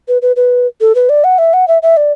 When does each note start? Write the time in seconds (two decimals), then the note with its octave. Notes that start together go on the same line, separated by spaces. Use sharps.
0.08 B4
0.22 B4
0.36 B4
0.81 A4
0.95 B4
1.09 D5
1.24 F#5
1.38 E5
1.53 F#5
1.68 E5
1.82 E5
1.97 D5